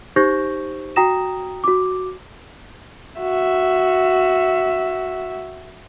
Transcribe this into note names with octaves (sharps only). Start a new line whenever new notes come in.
D#4 G4 C5 C#6 G6 A#6
F#4 G5 A#5 D#6 A#6 E7
F#4 D6
F#4 E5